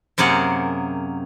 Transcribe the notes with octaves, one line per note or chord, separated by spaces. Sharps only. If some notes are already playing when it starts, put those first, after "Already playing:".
F#2 C3 A#3 G#4 F#5